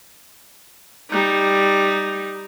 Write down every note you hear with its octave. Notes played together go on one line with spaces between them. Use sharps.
G3 D#4